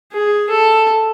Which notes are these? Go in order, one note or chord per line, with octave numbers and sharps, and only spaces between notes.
G#4
A4